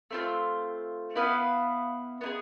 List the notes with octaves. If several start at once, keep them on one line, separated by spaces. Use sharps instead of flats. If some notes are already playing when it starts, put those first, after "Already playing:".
A3 C4 F4
B3 E4 B4 F5
B3 E4 G#4